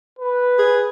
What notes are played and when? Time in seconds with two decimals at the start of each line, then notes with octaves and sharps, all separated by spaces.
0.19 B4
0.59 G#4